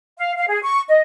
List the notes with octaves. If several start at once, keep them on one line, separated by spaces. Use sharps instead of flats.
F5
F5
G#4
C#6
D#5